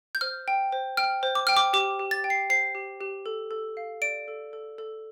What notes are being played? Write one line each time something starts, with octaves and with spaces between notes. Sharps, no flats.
G6
C5 F6
G5
C5
G5 F6
C5
D6
G5 F6
D6
G4 D6
G4
A6
G5
C7
C5 C7
G4
G4
A4
A4
F5
D5 D7
A4
A4
A4